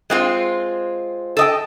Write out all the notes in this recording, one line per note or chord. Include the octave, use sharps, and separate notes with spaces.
G#3 C4 F4
A4 D#5 G5